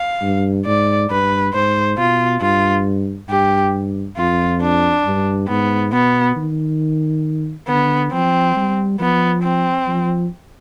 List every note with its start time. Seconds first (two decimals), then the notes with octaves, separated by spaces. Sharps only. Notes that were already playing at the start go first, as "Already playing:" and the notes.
Already playing: F5
0.22 G2
0.66 G#2 D5
1.10 G2 B4
1.54 G#2 C5
1.98 B2 F4
2.41 G2 F4
3.29 G2 G4
4.17 F2 F4
4.61 D4
5.06 G2
5.48 G#2 B3
5.92 B2 B3
6.36 D#3
7.68 D3 B3
8.12 F3 C4
8.56 G3
9.00 F3 B3
9.43 C4
9.88 F3